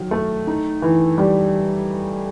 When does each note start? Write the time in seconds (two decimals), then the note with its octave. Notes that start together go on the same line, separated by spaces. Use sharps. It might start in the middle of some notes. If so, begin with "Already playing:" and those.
Already playing: D#3 F#3
0.11 A3
0.47 D#4
0.82 E3
1.18 G3